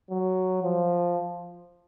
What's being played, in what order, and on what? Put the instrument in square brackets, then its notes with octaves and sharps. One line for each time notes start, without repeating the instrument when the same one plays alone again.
[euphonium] F#3
F3